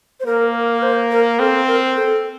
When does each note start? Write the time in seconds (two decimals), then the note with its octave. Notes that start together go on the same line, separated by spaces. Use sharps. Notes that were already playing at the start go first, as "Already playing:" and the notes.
0.20 C5
0.26 A#3 A#4
0.74 A#4
0.83 C5
1.11 A#4
1.39 C4 A4
1.67 A#4
1.96 A4